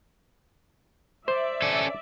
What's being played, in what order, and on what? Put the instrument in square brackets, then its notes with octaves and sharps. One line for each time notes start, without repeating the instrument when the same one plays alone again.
[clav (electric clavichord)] C5 [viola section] D5 E5
[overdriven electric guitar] C#4 A4